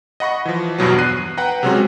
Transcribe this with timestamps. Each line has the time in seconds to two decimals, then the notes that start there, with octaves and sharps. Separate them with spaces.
0.20 D#5 F#5 B5 C#6 A#6
0.45 E3 F3
0.78 E2 G2 B2 F#3
0.98 F#6 C7 D#7
1.37 B4 F#5 G5 A#5
1.63 C3 F#3 G#3 C4 C#4 F#4